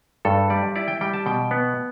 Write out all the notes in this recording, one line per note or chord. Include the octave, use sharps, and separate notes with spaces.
G2 A4
G3 D5
E4 D5
G5
G3 G5
A5
B2 G5
B3